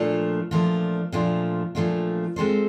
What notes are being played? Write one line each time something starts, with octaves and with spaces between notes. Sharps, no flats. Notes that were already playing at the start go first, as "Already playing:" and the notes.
Already playing: A#2 F3 A3 D4 F4
A#2 F3 A3 D4 F4
A#2 F3 A3 D4 F4
A#2 F3 A3 D4 F4
G#3 C4 F4 A4 C5